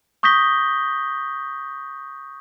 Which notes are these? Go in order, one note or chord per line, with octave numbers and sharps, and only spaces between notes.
C#6 D#6 G6 A#6 B6 G7